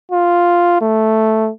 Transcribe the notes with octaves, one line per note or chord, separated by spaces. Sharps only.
F4
A3